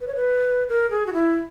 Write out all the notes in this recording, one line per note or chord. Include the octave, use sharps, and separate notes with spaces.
B4
C#5
B4
A#4
G#4
F#4
E4